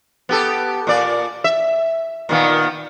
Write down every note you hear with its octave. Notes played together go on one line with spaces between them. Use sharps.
B3 G4 A4
A#2 D5
E5
A#2 D#3 B3